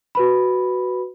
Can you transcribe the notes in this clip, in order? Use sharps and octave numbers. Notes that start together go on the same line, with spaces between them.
F#4 B4 B5